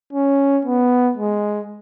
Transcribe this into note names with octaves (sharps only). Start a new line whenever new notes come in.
C#4
B3
G#3